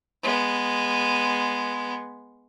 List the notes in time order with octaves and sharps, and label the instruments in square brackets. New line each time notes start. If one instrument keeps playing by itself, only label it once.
[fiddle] G#3 B3